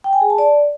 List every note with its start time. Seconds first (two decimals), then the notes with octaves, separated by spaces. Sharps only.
0.04 G5
0.13 G#5
0.21 G#4
0.30 A5
0.38 D5